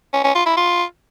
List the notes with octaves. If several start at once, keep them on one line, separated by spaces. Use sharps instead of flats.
C#4
C#4
F4
E4
F4